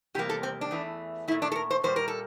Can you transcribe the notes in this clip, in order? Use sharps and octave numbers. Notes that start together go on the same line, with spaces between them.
E2 C3 G3 A#3 G4
A4
C4
D4
E2 E3 A3
A#2 A3 E4
D4
A4
A#4
C5
A#2 G3 A#3 C5
A#4
A4